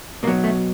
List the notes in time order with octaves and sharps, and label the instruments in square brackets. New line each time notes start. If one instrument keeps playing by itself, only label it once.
[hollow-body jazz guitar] B2 A#3
F#3
A3